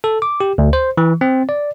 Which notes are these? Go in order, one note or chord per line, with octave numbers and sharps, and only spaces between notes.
A4
D6
G4
D2
C5
E3
C4
D5